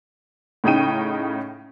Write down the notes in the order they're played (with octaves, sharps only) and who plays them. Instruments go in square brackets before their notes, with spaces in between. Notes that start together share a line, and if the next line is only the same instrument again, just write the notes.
[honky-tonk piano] A2 C#3 D#4 G5 D#7